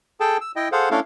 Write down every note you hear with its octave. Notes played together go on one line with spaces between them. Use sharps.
G#4 A4 G5 A5
E6
E4 D#5 G5
G#4 A4 C5 F5 F#5
A3 C#4 D4 E4 A4 F5